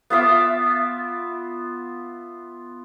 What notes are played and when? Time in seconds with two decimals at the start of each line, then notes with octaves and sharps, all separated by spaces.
0.10 B3 F4 E5 D6